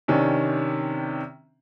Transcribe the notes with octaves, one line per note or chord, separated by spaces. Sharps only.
C3 D#3 C#4 D4